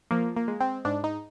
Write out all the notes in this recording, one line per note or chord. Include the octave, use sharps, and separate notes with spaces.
F3 A#3
A#3
G#3
C4
G#2 D4
D#4